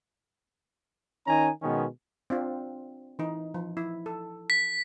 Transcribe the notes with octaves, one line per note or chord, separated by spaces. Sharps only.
D#3 C#4 D#4 G#5 A#5
B2 D#3 G#3 B3 C#4
C4 D4 F4
E3 D#4
F3
E4
A4
B6